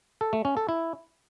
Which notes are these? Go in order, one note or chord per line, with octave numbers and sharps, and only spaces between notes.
A4
A3
C#4
A4
E4